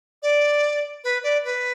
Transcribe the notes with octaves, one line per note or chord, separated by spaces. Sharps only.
D5
B4
D5
B4